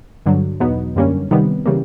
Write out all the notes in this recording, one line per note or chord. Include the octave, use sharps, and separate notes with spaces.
G2 D3 F#3
E2 B2 F#3 B3 D#4
F#2 D3 G3 A#3 C#4
C3 D#3 G3 B3
C#3 E3 G3 A#3